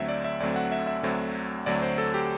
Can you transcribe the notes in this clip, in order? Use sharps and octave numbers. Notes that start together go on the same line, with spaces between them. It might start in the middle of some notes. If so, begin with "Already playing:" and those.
Already playing: D2 D3 F#3 A3 C4 E5
D5
E5
D2 D3 F#3 A3 C4 D5
F#5
E5
E5
D2 D3 F#3 A3 C4
D2 D3 F#3 A3 C4 D5
C5
A4
G4